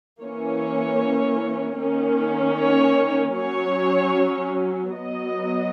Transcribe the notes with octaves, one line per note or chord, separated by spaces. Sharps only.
E3 A#3 C#4 C#5
D#3 A#3 C#4
C#5
F#3 C#4 C#5
F#3 B3 D#5